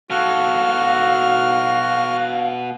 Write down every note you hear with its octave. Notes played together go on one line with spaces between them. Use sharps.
B2 F#4 A4 F5 F6